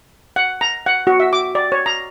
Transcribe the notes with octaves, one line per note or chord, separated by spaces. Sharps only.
F#5
A#5
F#5
F#4
E5
D6
D5
C#5
A#5